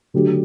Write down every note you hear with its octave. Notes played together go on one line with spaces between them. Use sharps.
D3 F#3 A3 D4 G4